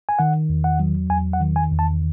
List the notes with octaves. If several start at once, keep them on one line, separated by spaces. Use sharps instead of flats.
G#5
D#3 F#5
E2
F#5
F#3
E2 G#5
F#5
D#3
G#5
E2
A5